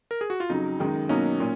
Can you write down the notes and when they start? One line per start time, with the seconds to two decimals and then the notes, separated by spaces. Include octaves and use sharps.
0.11 A#4
0.21 G#4
0.30 F#4
0.40 F4
0.50 F2 C#3 F#3 D#4
0.79 F#2 D#3 G#3
1.09 B2 F#3 A#3 C#4 D#4
1.40 A#2